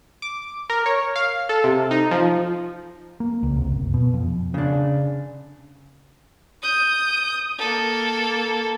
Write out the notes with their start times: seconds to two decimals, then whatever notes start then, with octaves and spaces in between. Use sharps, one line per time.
0.22 D6
0.70 A#4
0.86 C#5
1.16 F5
1.49 A4
1.64 C3
1.91 D#4
2.11 F3
3.20 A#3
3.43 C#2
3.56 C2
3.72 F#1
3.94 B2
4.14 F2
4.54 C#3 D4
6.62 D#6 G6
7.59 A#3 A4